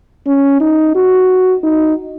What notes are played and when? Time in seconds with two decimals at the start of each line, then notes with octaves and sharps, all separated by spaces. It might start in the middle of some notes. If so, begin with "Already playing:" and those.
0.27 C#4
0.61 D#4
0.95 F#4
1.63 D#4